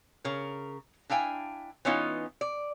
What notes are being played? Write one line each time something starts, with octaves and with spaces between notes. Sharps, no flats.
C#3 A#4
D4 E4 F5 G5 G#5
E3 B3 C#4 D#4 F4
D5